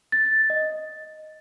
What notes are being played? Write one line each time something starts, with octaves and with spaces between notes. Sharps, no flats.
A6
D#5